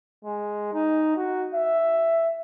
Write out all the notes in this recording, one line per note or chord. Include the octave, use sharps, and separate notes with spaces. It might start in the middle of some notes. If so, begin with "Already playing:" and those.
G#3
D#4
F#4
E5